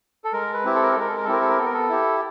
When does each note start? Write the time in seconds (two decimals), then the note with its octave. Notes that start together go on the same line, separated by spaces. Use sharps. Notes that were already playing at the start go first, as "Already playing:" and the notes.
0.24 A4
0.33 G#3 A#4
0.54 B4
0.64 C4 E4 G4
0.75 A4
0.83 A#4
0.91 A4
0.96 G#3 A#4
1.08 A4
1.17 A#4
1.24 A4
1.28 C4 E4 G4 A#4
1.41 A4
1.49 A#4
1.58 B3 A4
1.66 A#4
1.74 A4
1.89 E4 G4